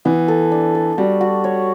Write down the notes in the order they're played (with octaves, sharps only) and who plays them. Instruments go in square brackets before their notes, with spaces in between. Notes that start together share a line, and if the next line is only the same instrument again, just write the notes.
[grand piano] E3 [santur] B3
[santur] A4
D4
A4
[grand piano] G3 [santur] F#4
[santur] F#4
C#5